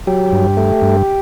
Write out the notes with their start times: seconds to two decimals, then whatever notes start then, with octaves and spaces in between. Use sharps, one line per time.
0.07 F#3 G4
0.32 G2
0.57 A3
0.82 G2